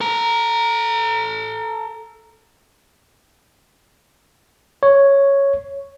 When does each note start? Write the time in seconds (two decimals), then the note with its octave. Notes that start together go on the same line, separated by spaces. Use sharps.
0.01 A4 A#5
4.83 C#5